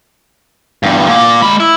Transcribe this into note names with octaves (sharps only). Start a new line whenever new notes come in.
E2 G2
A#2 D5
G#3 B5
E4